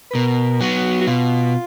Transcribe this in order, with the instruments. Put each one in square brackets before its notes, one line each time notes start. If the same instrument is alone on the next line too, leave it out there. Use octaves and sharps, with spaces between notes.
[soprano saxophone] B4
[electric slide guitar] B2 [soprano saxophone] A#4
[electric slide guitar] F#3 B3 [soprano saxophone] F#4
[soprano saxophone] F#4
[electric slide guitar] B2 [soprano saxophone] F4